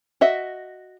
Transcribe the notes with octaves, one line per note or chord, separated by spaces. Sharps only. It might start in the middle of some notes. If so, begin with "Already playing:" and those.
F#4 D#5 E5